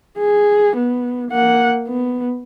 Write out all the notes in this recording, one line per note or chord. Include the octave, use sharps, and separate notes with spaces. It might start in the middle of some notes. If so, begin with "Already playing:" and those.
G#4
B3
A#3 F#5
B3